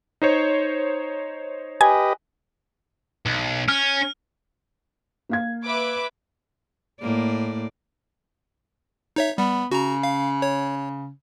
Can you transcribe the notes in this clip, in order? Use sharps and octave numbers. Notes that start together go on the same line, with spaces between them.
D#4 C5 C#5
G4 B4 D#5 G#5
B1
C#4 F6
A#3 F5 G#6
B4 E5 D6
A2 A#3 D5
D#4 C#5 E5
G3 B3
C#3 F#4 A#5
F5
C#5